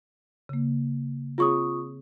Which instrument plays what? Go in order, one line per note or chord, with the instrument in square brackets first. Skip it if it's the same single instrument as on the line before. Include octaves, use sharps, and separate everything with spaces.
[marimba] C#3 A#3
[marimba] C4 G#4 C#5 [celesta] F4 C#6 D#6